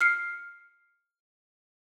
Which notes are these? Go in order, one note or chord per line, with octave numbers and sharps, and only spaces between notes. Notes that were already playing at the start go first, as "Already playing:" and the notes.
F6 C7 C#7